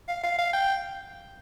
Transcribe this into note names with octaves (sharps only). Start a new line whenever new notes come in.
F5
F5
F5
G5